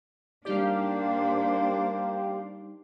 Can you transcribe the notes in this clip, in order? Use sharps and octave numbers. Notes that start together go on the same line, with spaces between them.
G3 A#3 D4 D#4 G4 C5 D5 F5